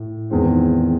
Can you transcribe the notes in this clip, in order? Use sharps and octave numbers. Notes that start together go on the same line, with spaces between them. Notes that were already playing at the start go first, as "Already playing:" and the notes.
Already playing: A2
E2 D#3 G#3 C4